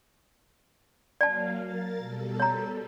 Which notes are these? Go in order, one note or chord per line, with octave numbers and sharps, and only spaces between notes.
F#3 A#3 D5 F5 A5
A#4 A6
B2 G3 A4
C#5 A#5